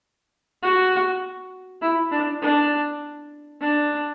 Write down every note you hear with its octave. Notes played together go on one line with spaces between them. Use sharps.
F#4
E4
D4
D4
D4